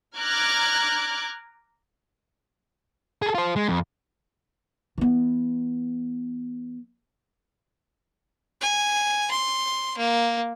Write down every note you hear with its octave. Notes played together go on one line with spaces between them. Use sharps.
A#5 D6 F6 F#6 G#6
G#4 A4
F4 C5
G#3
F2
E3 B3
G#5
C6
A#3